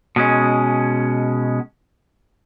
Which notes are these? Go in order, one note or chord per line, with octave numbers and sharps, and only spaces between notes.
B2 G#3 C#4